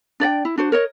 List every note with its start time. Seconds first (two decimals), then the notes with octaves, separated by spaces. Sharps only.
0.20 D4 D5 D#5 G5
0.45 E4
0.58 D4 F#4 C5
0.72 A#4 C#5 D#5